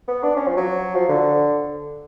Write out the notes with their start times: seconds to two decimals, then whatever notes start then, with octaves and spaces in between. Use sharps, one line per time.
0.08 B3
0.23 D4
0.37 C#4
0.48 F3
0.57 F#3
0.95 F3
1.09 D3